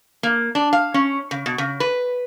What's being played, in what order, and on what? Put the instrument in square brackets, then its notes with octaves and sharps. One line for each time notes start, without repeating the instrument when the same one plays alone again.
[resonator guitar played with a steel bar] A#3
D4
F5
C#4
C#3
B2
C#3
B4